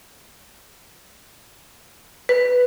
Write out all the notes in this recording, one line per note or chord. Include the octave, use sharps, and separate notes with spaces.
B4